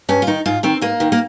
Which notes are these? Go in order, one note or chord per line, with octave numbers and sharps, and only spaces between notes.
G2 C#4
F4
D#3 D#4
G#2 F4
D#3 C4
G#2 A#3
D#3
A#3